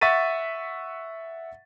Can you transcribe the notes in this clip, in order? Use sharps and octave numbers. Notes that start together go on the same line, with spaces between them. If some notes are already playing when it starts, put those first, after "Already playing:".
E5 F#5 C#6 A6 B6 D#7